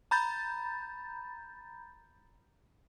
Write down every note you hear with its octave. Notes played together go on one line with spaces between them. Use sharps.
A#5 B5 G6 A6